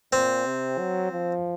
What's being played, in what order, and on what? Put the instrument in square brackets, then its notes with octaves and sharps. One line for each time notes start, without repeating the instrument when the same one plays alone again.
[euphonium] A#2 [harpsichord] C4
[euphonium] C3
F#3
F3